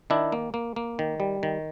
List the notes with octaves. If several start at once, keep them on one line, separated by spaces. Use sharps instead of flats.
D#3 D4 E4
A#3
A#3
A#3
D#3
G3
D#3